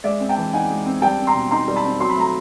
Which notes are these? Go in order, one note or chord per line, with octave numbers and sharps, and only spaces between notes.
G#3 D5 E5
C4
G5 A5
E3
D#4 F#5 G#5
G#3
C4
G3 G5 A5
C4
A#5 C6
B2
D#4 A#5 C6
G3
A5 B5
C4
F#3 C6
B5
A3 A#5